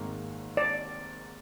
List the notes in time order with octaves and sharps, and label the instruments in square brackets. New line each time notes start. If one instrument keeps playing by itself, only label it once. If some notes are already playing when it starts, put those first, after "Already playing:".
Already playing: [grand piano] G#1 G#2 D#3 A#3
[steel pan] D5